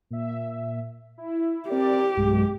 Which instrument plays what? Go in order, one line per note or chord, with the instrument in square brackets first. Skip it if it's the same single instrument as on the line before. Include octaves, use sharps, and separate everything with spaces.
[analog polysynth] A#2 E5
E4
[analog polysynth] C4 A#4 D5 [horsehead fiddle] G4
[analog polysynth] B1 G2 G#3